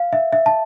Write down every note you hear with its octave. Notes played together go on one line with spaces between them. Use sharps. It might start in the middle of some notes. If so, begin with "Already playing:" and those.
Already playing: F5
E5
E5
A5